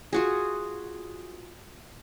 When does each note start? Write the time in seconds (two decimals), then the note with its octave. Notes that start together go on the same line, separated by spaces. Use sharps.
0.13 F4 F#4 G#4